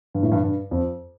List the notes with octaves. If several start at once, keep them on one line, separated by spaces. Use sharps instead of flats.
G2
A2
G2
G2
F2